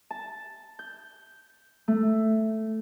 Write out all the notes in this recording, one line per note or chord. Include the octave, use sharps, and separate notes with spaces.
A5
G6
A3